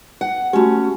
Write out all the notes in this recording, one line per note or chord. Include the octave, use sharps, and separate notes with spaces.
F#5
A3 C#4 F#4 G4